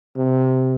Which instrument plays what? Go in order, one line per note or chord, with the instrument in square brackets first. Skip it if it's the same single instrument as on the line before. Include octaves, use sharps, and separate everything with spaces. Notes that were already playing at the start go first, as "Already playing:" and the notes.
[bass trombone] C3